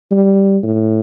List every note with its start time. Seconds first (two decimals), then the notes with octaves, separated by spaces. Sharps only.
0.11 G3
0.63 A2